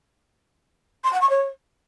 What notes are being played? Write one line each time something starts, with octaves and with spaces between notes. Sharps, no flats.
C6
F#5
C#6
C#5